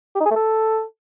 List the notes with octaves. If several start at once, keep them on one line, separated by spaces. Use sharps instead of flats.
G4
D#4
G#4
A3
A4